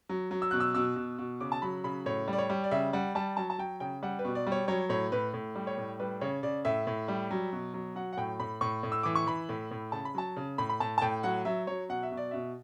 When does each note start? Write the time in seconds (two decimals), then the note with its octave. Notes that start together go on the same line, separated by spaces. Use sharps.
0.09 F#3
0.31 F#3
0.42 E6
0.51 B2 F#6
0.60 E6
0.74 B2 E6
0.96 B2
1.18 B2
1.40 C#3 D6
1.52 A5
1.62 F#3 B5
1.84 C#3 B5
2.06 A2 C#5
2.28 G3
2.33 D5
2.38 C#5
2.50 G3
2.64 D5
2.71 C#3 E5
2.93 G3 F#5
3.15 G3 A5
3.37 F#3 A5
3.50 A5
3.58 F#3 G5
3.80 C#3 G5
4.03 G3 F#5
4.19 B4
4.25 B2
4.35 D5
4.47 G3
4.52 C#5
4.68 F#3 C#5
4.89 A2 C#5
5.12 A2 B4
5.34 A2
5.55 G3
5.67 C#5
5.78 A2
6.00 G3 B4
6.21 C#3 C#5
6.43 C#3 D5
6.65 A2 E5
6.87 A2
7.08 G3
7.31 F#3
7.52 B2
7.74 F#3
7.96 F#3 F#5
8.13 F#5
8.17 A2 G5
8.40 A2 B5
8.61 A2 C#6
8.83 A2
8.92 E6
9.03 E3 D6
9.15 C#6
9.26 E3 B5
9.49 A2
9.71 A2
9.92 C#3 A5
10.05 B5
10.15 F#3 A5
10.36 C#3
10.58 A2 B5
10.69 B5
10.80 A2 A5
10.98 A5
11.02 A2 G5
11.23 F#3 F#5
11.45 F#3 E5
11.67 F#3 C#5
11.89 B2 F#5
12.03 E5
12.11 B2
12.17 D5
12.31 B2 E5